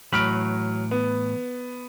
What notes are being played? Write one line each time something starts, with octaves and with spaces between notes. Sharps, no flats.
A2 E3 F#3 B5 F6 D7
B3